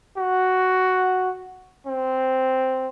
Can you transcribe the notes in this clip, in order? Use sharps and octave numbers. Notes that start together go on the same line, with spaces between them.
F#4
C4